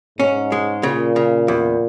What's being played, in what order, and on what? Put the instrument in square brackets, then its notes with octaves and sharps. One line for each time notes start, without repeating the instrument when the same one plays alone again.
[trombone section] G#2 [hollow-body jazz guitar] C#4
[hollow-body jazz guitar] G#3
[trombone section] A#2 [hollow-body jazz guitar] C#3
[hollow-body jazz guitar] C#3
E2